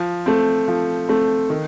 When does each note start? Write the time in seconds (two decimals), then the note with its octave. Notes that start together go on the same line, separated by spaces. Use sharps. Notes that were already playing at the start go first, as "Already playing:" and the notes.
Already playing: F3
0.26 A3 C4
0.68 F3
1.09 A3 C4
1.50 D#3